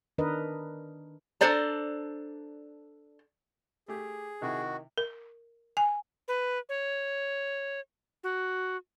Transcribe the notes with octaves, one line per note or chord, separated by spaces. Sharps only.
D#3 D4 A#4 B4 D#5
D4 A4 C5 D5 A#5
A3 G4 G#4
C3 D#3 D#4 E4 F#4
A#4
G#5
B4
C#5
F#4